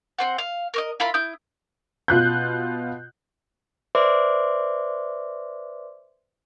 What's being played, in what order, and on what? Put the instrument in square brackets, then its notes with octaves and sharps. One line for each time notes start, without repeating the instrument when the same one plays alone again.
[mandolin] C4 C5 F#5
F5
A#4 C#5 D#5
E4 F4 A#4 B5
E4 D#6 G6
[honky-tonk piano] B2 F4 F#6 G6
[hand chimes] B4 C5 D5 E5 C6 D6